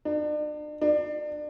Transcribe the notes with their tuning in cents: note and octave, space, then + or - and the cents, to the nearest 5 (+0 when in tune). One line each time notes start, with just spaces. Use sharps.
D4 +40
D4 +30